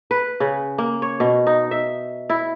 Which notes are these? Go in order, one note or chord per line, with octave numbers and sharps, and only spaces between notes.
B4
C#3
A#3
C#5
B2
D#4
E5
E4